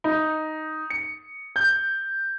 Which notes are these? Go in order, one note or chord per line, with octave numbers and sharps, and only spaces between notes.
D#4
C#7
G6